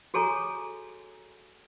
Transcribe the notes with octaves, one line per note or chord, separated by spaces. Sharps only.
F#4 G#4 A4 C#5 G#5 A#5